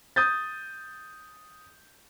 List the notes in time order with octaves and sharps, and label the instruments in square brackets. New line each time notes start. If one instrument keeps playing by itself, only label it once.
[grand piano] D#6 G6 A6